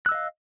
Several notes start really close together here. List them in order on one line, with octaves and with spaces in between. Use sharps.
F#6 E6 D#5 F5